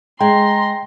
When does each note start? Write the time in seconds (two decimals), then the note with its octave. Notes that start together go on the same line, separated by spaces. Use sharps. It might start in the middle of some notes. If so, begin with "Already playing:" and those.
0.21 G#3 G5 A#5 C6